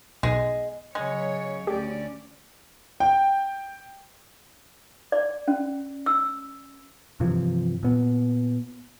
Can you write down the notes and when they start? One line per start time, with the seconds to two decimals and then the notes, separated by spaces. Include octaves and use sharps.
0.23 B1 G#3
0.95 C#3 F#3 G#3 C#5
1.67 D2 C#4 G4 D5
3.00 G5
5.12 D5
5.48 C#4
6.06 E6
7.20 G2 C3 E3 F3
7.83 A#2 B3